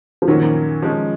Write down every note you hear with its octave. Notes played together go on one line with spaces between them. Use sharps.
F3
A#2 D#3 F#3 C#4
F3 G#3 C#4